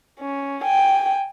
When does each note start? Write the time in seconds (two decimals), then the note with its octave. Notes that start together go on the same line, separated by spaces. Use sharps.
0.19 C#4
0.62 G5 G#5